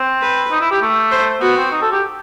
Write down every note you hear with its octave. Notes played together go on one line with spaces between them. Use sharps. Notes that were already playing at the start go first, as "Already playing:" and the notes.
Already playing: C4
B4
D#4
E4
G4
A3
C5
B3 F#4
C4
D#4
A4
G4